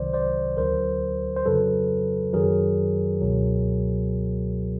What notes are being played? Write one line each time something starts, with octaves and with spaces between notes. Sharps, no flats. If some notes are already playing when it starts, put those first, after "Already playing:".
Already playing: C2 C3 D#3 F#3 C5 D5
C5 D5
D2 D3 F#3 A#4 C5
C5
F2 C#3 F#3 A4 B4
F#2 D#3 F#3 G#4 A#4
C#2 B2 F#3